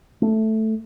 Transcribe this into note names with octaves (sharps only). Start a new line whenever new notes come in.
A3